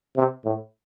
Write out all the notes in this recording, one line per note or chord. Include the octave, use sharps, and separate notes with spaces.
C3
A2